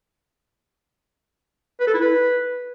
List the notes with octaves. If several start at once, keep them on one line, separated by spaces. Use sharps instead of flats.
B4
A4
E4
B4